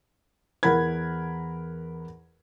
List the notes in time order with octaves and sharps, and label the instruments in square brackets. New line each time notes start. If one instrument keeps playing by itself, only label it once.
[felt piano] E2 A#4 F#5 B5 G#6